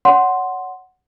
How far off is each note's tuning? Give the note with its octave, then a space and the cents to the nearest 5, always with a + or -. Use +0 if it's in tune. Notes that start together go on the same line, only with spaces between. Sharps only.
C#5 +30 F#5 +0 C6 +0